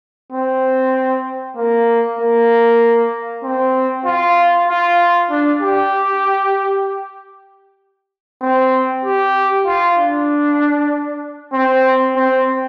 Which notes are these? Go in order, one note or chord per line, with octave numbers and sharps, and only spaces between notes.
C4
A#3
A#3
C4
F4
F4
D4
G4
C4
G4
F4
D4
C4
C4